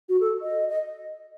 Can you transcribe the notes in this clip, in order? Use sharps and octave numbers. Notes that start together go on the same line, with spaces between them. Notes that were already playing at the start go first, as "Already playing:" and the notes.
F#4
A4
D#5
D#5